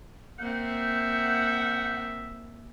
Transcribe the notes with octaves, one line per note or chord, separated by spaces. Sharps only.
A#3 C4 E5 F#5 G6